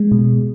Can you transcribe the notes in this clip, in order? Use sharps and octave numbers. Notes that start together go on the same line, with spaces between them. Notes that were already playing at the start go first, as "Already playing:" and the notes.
Already playing: G#3
B2